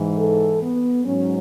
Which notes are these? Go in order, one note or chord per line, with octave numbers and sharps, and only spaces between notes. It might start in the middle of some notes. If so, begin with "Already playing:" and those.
Already playing: G#2 E3
A4
B3
G#2 F#3 C#4